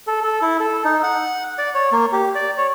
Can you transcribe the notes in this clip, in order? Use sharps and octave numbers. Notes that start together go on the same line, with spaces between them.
A4
A4
E4
A4
D#4
F#5
D5
C#5
A#3
G4
D5
C#5